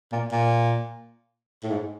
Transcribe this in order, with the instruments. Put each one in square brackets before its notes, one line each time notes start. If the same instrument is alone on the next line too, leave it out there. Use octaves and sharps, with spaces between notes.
[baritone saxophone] A#2
A#2
A2
G#2